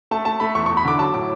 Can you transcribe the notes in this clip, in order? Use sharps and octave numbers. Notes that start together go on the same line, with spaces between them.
A3 A5
A3 A5
A3 B5
E2 C#6
C#6
E2
B5
D3 D6
F#3 A5
A2 D6